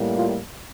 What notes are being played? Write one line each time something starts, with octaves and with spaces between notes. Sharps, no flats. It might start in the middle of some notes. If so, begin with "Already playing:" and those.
Already playing: A2 G3 A#3
F4